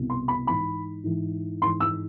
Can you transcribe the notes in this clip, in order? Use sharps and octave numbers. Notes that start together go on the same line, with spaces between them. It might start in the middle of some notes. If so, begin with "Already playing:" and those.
Already playing: C2 B2
C6
B5
G#2 E3 B5
G#2 E3
G#2 E3 C6
E6